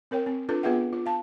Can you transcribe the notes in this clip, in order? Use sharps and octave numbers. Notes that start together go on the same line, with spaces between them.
C4 A#4 C#5 G5
C4
D4 F4 A4 B4
B3 F4 G#4 B4 E5 F#5
F4
F5 A5